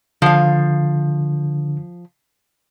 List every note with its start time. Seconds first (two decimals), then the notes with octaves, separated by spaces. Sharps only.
0.22 D3 F3 F5